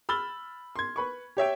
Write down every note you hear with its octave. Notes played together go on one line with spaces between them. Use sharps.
B5 E6 F6 A6 G7
C6 G#6
B4 B5 C#6
G4 C#5 E5 G5